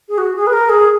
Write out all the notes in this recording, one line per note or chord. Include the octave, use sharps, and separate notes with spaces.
G#4
F#4
G#4
B4
A#4
G#4